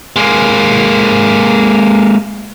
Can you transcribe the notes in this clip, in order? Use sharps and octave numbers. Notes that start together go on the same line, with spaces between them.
G#3 A#3